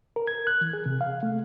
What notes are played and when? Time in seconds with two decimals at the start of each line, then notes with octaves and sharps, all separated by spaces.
0.16 A#4
0.27 G#6
0.47 F#6
0.61 E3
0.73 G#4
0.86 C3
1.01 F5
1.23 A3